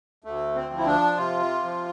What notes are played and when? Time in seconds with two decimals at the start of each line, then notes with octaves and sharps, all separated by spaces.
0.24 D2 A3
0.55 C4
0.70 F3
0.77 E4
0.86 D4
1.17 C3 F4
1.63 F3